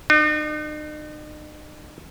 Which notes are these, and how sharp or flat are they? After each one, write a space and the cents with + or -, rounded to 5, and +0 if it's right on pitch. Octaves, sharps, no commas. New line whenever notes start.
D#4 -45